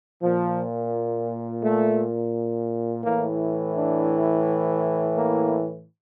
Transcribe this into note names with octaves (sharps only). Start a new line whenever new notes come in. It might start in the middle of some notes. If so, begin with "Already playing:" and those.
A#2 F3
A3
A2 E3 A#3
D4
A#3